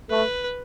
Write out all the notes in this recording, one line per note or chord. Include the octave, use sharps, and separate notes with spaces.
A3 B4